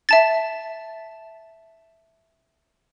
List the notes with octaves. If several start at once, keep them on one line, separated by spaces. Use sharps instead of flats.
E5 A5 A6